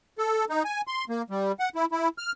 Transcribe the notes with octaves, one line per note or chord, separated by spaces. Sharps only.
A4
D#4
G#5
C6
A#3
G3
F#5
E4
E4
F6